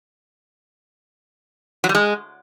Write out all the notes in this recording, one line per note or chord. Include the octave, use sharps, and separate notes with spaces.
F#3
G3
G#3